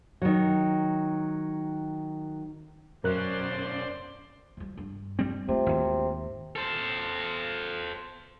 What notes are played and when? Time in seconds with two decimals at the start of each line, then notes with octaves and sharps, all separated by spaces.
0.22 D#3 F#3
3.04 B1 F#2 C#4 A#4 C5 D5 C6 F#6
4.57 F3 G3
4.77 G2
5.19 G3 C4
5.48 C3 A3 F4
5.66 G#1 D#2
6.56 A4 C5